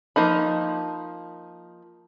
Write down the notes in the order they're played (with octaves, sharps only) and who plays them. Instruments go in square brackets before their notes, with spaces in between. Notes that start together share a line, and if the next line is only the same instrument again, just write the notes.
[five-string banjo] F3 A#3 D#4 B5